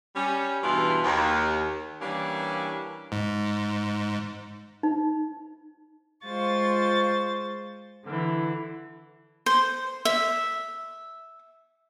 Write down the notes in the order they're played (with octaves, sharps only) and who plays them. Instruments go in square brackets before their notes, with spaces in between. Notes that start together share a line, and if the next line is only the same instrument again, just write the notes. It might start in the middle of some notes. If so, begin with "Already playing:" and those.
[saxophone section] G3 C#4
E2 G2 B2 E3 F4
D#2
E3 G3 A#3 C#4 D4
[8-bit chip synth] G#2
[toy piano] D#4
[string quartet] G#3 F4 C5 C#6 A6
D3 E3
[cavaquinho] C5
E5